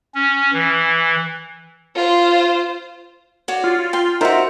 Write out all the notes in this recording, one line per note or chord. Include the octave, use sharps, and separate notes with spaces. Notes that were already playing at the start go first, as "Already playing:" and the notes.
C#4
E3
F4 C5
F#4 C#5 D5
F4
G5 C6
D#4 F#4 A#4 C5 E5